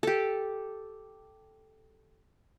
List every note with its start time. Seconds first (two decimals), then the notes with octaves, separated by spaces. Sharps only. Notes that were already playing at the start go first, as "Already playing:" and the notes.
0.03 G4 A4